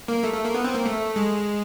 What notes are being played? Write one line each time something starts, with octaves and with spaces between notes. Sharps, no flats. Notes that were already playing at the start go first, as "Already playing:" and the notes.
A#3
A3
A3
A#3
B3
C4
A#3
A3
G#3